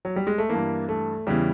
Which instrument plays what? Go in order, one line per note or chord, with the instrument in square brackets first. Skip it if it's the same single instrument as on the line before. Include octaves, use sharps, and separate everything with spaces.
[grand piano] F#3
G3
G#3
A3
G2 E3 A#3
A3
E2 C#3 E3 G3